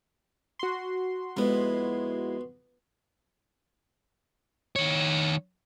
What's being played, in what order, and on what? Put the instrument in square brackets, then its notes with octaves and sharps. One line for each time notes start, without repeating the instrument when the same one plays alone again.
[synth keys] F#4 C6
[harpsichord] F2 B3 [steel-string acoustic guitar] G#3 E4
[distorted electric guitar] D#3 C#5